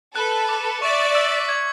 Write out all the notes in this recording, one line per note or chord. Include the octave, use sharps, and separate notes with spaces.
A4 B4 F#6
F#6
D6
C#7
D5 E5 C#6
C#6
E6
B6
G#6